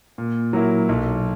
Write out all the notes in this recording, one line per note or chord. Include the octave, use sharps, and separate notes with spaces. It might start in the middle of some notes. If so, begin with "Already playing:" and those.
A#2
F#3 A#3 E4
B1